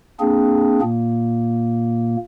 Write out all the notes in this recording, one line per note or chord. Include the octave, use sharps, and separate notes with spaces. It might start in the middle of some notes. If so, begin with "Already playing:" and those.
A#3 C4 D4 G#4
A#2 A#3